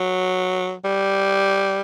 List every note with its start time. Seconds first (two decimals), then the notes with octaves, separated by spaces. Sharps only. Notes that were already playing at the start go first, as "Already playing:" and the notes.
Already playing: F#3
0.84 G3